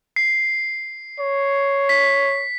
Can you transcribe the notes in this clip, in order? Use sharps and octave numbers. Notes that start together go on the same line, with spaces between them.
C7
C#5
B6